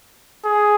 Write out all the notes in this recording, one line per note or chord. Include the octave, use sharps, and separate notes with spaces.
G#4